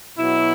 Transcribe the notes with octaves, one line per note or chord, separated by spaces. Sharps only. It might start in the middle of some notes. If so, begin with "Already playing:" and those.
B2 F#3 E4